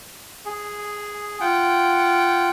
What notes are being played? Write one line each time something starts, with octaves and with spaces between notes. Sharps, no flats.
G#4
F4 F#5 G5